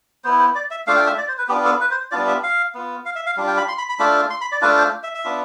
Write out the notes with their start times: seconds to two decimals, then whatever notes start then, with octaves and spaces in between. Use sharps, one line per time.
0.24 B3 E4 C5
0.39 C5
0.55 D5
0.71 E5
0.87 A3 D4 F4 F5
0.96 G5
1.07 E5
1.18 D5
1.28 C5
1.38 B4
1.49 B3 D4 F4 G4
1.65 A4
1.81 B4
1.91 C5
2.11 G3 B3 D4 F4 D5
2.27 E5
2.43 F5
2.75 B3 F4
3.05 F5
3.16 E5
3.26 F5
3.37 G3 D4 F4
3.47 G5
3.57 B5
3.68 C6
3.78 B5
3.89 B5
4.00 A3 D4 F4 B5
4.30 C6
4.41 B5
4.52 D5
4.62 A3 D4 F4 B4
4.78 C5
5.03 E5
5.15 E5
5.25 B3 D4 F4